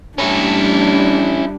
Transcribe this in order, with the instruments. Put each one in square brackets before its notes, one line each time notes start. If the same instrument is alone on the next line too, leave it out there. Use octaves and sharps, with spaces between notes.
[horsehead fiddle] G3 D4 [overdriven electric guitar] C#4 E4